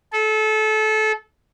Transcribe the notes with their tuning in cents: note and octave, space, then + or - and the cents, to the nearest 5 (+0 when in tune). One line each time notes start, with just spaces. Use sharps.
A4 -25